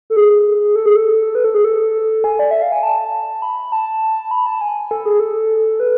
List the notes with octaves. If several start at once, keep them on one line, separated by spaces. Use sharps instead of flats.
A4
G#4
A4
G#4
A4
B4
A4
G#4
A4
G#5
D5
E5
F5
G#5
A5
B5
A5
B5
A5
G#5
A4
G#4
A4
B4